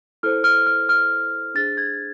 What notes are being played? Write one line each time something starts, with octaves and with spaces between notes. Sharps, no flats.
E4 A4 C5 F6
F6
F6
F6
D4 G#4 C5 A6
G#6